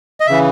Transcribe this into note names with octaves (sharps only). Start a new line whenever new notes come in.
D#5
C#3 E3 E5